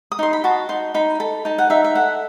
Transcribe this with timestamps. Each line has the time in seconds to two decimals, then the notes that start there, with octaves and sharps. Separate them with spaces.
0.12 D#6
0.19 D#4 C6
0.33 B5
0.44 F#4 A5
0.69 D#4 C6
0.94 D#4 B5
1.20 A4 B5
1.45 D#4 A5
1.58 F#5
1.70 D#4 E5
1.84 E5
1.95 A4 F#5